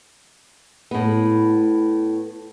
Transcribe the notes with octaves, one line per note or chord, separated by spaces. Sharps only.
A2 B3